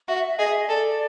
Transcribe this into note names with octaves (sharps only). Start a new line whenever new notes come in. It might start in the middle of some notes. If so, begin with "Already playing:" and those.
F#4 E5
E5
E5
G#4 D#5
E5
D#5
A4 D5